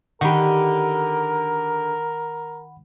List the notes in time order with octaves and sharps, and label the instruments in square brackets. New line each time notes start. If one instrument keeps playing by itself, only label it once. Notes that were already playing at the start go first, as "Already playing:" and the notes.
[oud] D3 G4 [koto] D#3 [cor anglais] A#4 [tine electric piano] F#5 B5